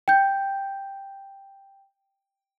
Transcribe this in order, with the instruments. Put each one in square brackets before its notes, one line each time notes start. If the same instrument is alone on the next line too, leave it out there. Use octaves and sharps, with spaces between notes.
[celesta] G5 G6